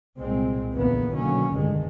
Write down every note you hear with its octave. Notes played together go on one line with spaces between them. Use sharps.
C2 A#2 G#3 C4
A#1 E2 D3 E3 A#3 B3
B2 D3 D#3 F#3 A#3 C#4
F1 C#2 G2 D3 D#3 G#3